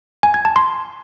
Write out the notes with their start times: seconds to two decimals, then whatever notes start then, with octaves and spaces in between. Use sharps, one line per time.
0.23 G#5
0.34 G#6
0.45 A5
0.56 C6